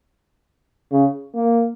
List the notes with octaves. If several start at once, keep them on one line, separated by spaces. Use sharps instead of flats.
C#3
A#3